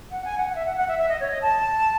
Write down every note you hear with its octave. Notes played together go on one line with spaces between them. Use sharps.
F#5
G#5
F#5
F#5
E5
F#5
F#5
E5
E5
D#5
C#5
D#5
A5